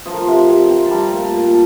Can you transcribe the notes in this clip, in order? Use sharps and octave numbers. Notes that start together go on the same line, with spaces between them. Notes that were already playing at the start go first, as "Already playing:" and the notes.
F3 C5
A#4
C5
C3
C3
C4
A5
G3 A#5
A#2
A5
A#2
A5